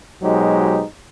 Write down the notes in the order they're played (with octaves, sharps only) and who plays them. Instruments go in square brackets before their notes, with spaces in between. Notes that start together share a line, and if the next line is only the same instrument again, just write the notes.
[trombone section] B2 F#3 G#3 D#4 G4 C5